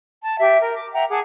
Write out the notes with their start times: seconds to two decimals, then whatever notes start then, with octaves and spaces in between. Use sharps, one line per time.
0.23 A5
0.40 G4 E5
0.60 A#4
0.75 D6
0.93 E5 F#5 G5 A#5
1.10 G#4 F#5 A5 D6